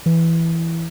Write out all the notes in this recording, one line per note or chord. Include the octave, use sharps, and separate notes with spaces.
E3